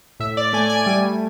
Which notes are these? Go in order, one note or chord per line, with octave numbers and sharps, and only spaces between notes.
A2 E5
D5
A3 G#5
G#5
G3 G#5